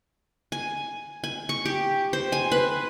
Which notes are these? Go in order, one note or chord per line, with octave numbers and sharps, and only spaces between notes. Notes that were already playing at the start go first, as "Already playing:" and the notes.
G#5
G#5
C#6
G4
C5
G#5
B4